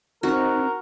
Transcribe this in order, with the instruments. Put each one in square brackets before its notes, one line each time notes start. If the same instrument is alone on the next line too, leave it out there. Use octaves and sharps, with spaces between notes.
[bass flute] C4 [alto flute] D#4 [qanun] F#4 [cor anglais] A#4